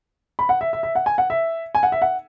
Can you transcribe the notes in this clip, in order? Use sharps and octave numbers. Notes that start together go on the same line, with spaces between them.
B5
F#5
E5
E5
E5
F#5
G#5
F#5
E5
G#5
F#5
E5
F#5